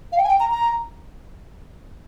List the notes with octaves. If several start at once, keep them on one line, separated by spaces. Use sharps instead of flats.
F5
G5
G#5
G5
A#5
A#5